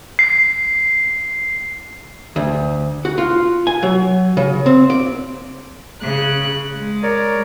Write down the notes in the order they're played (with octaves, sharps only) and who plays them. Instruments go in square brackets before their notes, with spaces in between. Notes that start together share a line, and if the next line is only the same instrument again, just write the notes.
[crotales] C7
[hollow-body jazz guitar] D2
F#4
F4
G#5
F#3
C#3
C4
D5
[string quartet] C#3 F#6
G#3
[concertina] A#4 C#5 D5